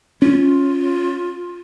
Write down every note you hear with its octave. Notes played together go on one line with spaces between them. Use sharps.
C#4 F4